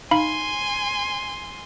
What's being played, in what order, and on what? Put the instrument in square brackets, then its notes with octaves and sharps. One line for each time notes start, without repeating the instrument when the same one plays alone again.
[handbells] D#4 F5 B5 [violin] G#5 C6